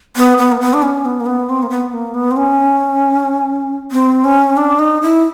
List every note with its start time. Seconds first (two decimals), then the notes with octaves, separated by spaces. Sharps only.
0.17 B3
0.38 B3
0.52 A#3
0.60 B3
0.73 D4
0.82 C#4
1.05 B3
1.20 A#3
1.26 B3
1.49 C4
1.63 A#3
1.70 B3
1.93 A#3
2.14 B3
2.31 C4
2.36 C#4
3.91 C4
4.24 C#4
4.57 D4
4.79 D#4
5.02 E4